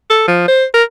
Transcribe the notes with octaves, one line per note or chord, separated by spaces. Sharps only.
A4
F3
C5
A#4